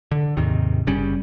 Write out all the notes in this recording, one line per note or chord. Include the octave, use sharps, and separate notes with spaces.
D3
D#2 G#2 C3 D#3
F#1 C#3 G3 C#4